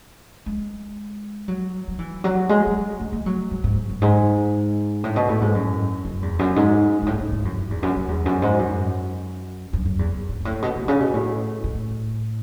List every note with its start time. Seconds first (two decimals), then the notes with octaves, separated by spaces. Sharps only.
0.46 G#3
1.48 F#3
1.88 F#3
1.99 E3
2.24 F#3
2.49 G#3
2.67 F#3
3.00 A3
3.13 A3
3.26 F#3
3.51 G#2
3.64 G#2
3.89 F#2
4.02 G#2
5.04 A2
5.16 B2
5.29 A2
5.41 G#2
5.55 F#2
6.05 F#2
6.22 E2
6.39 F#2
6.56 G#2
7.02 G#2
7.06 A2
7.20 G#2
7.32 G#2
7.45 F#2
7.57 F#2
7.70 E2
7.83 F#2
7.96 F#2
8.08 E2
8.26 F#2
8.42 G#2
8.59 F#2
9.73 F#2
9.86 F#2
9.99 E2
10.12 F#2
10.29 G#2
10.41 G#2
10.45 A2
10.62 B2
10.75 B2
10.88 C#3
11.00 B2
11.14 A2
11.64 A2